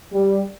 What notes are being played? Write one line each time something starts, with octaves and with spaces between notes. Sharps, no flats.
G3